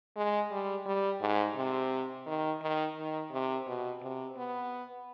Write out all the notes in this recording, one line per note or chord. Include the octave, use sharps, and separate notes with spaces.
G#3
G3
G3
G#2
C3
D#3
D#3
D#3
C3
B2
C3
B3